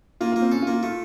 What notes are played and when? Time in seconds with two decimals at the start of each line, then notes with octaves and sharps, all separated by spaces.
0.20 A#3 F4
0.32 A#3 F4
0.42 C4
0.52 C#4 A4
0.62 F4
0.67 A#3
0.73 F4
0.83 A3 F4